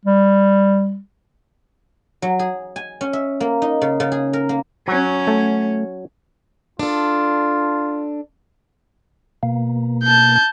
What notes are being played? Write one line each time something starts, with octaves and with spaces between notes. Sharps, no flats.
G3
F#3
G#4
G#5
C#4
E5
A#3
D#4
C#3
C#3
G#4
A#4
A#3
F#3 C#4
A3
D4 F4 A4
B2 A#3
A5 G6